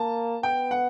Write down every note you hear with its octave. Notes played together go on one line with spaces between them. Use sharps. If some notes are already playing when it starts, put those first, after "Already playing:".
Already playing: A#3 A5
B3 G5
F#5